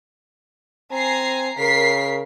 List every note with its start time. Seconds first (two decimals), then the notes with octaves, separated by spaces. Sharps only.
0.91 C4 G#5 A#5 C7
1.58 C#3 A#4 B6 C7